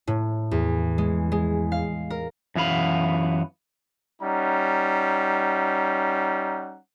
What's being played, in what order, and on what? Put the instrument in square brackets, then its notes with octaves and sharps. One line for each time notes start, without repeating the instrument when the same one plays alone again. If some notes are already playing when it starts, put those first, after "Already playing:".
[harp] A2
E2
G#3
G#3
F5
A#4
[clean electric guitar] F#2 E3 B3 F5 B5
[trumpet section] G3 C#4 D#4 F#5 A#5